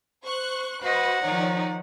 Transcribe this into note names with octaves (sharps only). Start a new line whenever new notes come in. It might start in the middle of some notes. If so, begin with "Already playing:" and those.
C5 C#6 F#6
F#4 B4 C5 D#5 F#5
D#3 F3 D#4 C#5 D5